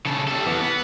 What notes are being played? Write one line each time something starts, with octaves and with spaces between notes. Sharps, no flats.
C#3 A4
G3 A4
E3 B3
B3